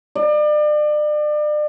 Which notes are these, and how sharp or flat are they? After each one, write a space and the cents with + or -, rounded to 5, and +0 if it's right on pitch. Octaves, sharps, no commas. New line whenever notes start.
D5 +35